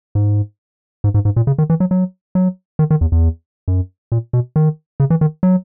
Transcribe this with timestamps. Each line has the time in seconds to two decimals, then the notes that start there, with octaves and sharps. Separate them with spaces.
0.15 G#2
1.04 G#2
1.14 G#2
1.25 G#2
1.36 A#2
1.47 C#3
1.58 D#3
1.70 E3
1.80 F#3
1.91 F#3
2.35 F#3
2.79 D#3
2.91 D#3
3.01 E2
3.12 E2
3.68 F#2
4.12 A#2
4.33 B2
4.56 D#3
5.00 C#3
5.10 E3
5.21 D#3
5.43 F#3